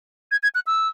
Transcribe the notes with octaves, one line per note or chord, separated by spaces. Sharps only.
G#6
G#6
F#6
E6